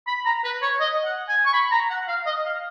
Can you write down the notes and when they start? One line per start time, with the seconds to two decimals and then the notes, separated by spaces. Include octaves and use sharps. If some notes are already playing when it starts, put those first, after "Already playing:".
0.07 B5
0.26 A#5
0.44 B4
0.62 C#5
0.80 D#5
1.05 F#5
1.29 G#5
1.45 C#6
1.53 B5
1.72 A#5
1.90 F#5
2.08 F5
2.26 D#5
2.45 F5